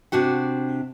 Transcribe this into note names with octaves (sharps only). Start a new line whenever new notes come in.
C3 D4 F#4 F#5